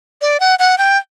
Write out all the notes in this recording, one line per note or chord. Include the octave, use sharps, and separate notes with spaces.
D5
F#5
F#5
G5